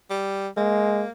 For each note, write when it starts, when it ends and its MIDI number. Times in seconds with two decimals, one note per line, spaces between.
0.10 0.48 55
0.57 1.04 56
0.57 1.11 58